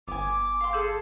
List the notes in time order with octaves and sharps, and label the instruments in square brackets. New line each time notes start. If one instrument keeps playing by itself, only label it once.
[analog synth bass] G1 [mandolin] B3 G#5 [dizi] D6
[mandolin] F5 C6
G#4 A4 G6